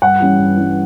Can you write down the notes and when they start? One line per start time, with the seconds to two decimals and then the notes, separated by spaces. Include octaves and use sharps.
0.02 G2 F#5
0.20 E3 G3 C#4
0.39 G2
0.57 E3 G3 C#4